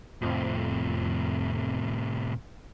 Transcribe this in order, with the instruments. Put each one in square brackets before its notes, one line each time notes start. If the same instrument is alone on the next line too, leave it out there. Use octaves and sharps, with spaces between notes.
[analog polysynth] F2 [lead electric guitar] A2 C3